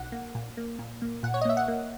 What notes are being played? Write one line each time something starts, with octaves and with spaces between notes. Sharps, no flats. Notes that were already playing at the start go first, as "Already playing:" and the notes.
Already playing: B1 F#5
A#3
A#2
A#3
A#2
A#3
A#2 F#5
C#5
D#5
A#3 E5
F#5
A#3